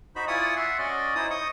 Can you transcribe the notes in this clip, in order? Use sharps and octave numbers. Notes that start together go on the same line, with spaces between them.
D#4 F#4 C5 B5
E4 F4 D5 G#5 C#6 D#6
E5 F#5 C6
C#4 F#4 D5 D#5
D#4 E4 C5 D#6
D#5 C#6 D#6